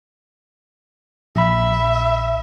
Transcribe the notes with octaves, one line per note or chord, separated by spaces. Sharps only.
A#1 E5 B5